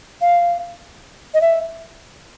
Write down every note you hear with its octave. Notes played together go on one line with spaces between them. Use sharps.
F5
D#5
E5